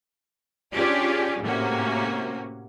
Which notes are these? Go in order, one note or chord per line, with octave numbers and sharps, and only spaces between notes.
C#4 D4 F4 G4 G#4 D5
A2 C3 A#3 C#4 F#4